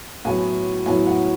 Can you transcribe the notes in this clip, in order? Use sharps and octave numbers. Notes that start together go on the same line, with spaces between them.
A2 F#3 B3 E4 G#5
A2 F#3 B3 E4 G#5
F#5